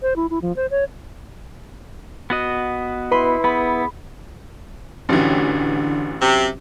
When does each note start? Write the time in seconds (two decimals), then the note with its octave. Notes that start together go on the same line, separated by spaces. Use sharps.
0.02 C5
0.16 E4
0.30 E4
0.42 F3
0.56 C5
0.71 C#5
2.30 B3 F#4 D#5
3.11 E4 B4 B5 C6 D#7
3.44 B3 G#4 B5
5.09 A1 D3 E3 C#4 F#4 G4
6.22 F#2 C3